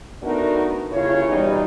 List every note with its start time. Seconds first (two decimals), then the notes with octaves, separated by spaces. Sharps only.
0.22 A3 B3 D4 D#4 F#4 A#4
0.91 D#2 C#3 E4 F4 C#5
1.27 B2 E3 G3 D#4